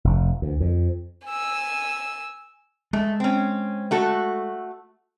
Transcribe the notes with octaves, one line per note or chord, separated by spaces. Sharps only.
F1
D2
F2
G#5 E6
G#3 A3
C4 C#4
A3 F#4 A4